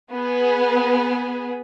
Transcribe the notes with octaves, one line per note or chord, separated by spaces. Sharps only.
B3 G#4 B4